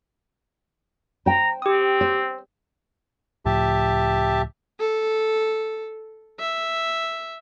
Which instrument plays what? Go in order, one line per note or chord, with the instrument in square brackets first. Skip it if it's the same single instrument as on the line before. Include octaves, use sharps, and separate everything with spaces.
[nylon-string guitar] C5 G5 [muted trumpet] A#5
[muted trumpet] C4 [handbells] G4 D#6
[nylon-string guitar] C5
[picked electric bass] C#2 A2 F3 [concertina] G4 E5 A5
[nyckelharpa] A4
E5